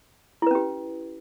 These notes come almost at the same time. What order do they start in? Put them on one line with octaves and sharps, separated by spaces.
E4 B4 C#4 G4